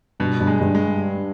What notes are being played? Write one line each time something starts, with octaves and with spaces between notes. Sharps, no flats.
G2 B2
G2
G#3
G2
G#3